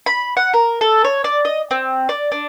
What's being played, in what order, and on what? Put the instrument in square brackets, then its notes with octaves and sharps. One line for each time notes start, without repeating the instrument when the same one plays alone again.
[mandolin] B5
F#5
A#4
A4
C#5
D5
D#5
C4
D5
D4